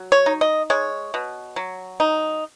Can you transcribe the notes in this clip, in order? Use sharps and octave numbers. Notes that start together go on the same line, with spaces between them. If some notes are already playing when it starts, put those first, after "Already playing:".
Already playing: F#3
C#5
D#4
D#5
G#3 C#5
B2
F#3
D#4